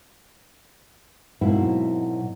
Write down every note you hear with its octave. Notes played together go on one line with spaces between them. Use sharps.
G#2 B2 F#3 A#3 C4 E4